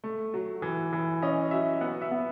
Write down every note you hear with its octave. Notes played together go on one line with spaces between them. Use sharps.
A3
F#3
E3
E3
C#4 D#5
F#3 E5
B3 F#5
E5
B3